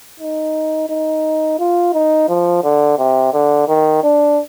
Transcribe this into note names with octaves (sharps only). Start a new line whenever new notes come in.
D#4
D#4
F4
D#4
F3
D3
C3
D3
D#3
D4